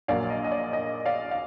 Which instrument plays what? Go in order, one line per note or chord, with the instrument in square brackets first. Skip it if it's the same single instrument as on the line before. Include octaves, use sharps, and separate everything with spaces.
[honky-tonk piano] A#1 A#2 F#3 A#3 D5 F5
D#5
D#5
D5
D#5
D5 F5
F5